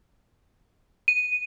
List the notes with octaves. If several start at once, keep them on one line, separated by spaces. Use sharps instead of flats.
D#7